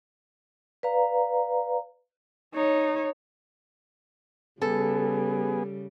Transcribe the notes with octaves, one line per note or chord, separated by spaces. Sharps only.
B4 D5 F5 A#5
D#4 C#5
C#3 G3 B3 G#4 A4